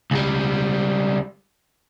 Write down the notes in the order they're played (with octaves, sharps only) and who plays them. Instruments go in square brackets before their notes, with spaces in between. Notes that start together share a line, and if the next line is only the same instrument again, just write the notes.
[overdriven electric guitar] C#2 G3